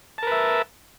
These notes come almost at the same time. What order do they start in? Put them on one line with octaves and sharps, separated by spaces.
A5 A#4 B4 E5